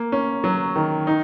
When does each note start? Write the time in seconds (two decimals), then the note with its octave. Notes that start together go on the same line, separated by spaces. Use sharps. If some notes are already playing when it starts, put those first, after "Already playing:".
Already playing: A#3
0.12 C#4
0.44 F#3
0.76 D#3
1.07 D#4